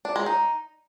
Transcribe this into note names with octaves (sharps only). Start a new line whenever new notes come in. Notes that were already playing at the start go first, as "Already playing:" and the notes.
D4
G#3
D#4